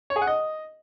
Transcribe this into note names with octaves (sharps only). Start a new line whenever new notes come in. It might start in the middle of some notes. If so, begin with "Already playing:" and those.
C#5
G#4
F#5
D#5